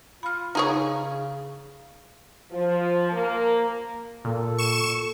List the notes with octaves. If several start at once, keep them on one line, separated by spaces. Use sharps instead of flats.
F4 B5 F6
C#3 D#4 G#4 C#5 A#5 C#6
F3
A#3
A#2 A4
C#6 E7